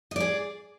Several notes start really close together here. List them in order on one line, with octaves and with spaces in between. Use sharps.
D#5 D5 G#4